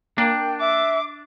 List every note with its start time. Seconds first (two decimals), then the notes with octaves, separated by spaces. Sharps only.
0.18 A#3 D4 G5
0.60 E5 D6